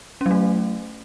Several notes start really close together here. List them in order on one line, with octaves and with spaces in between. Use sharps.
C#4 F#3 A3